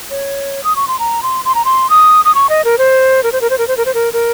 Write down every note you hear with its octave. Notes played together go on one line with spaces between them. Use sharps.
C#5
D#6
C#6
C6
A#5
C6
C6
A#5
C6
D#6
D#6
C#6
D#5
A#4
C5
A#4
C5
A#4
C5
A#4
C5
A#4
C5
A#4
A#4